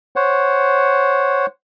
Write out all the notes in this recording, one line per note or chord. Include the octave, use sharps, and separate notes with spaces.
C5 C#5 F#5